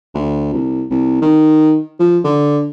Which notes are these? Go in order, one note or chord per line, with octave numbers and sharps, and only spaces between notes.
D2
C2
C2
D#3
F3
D3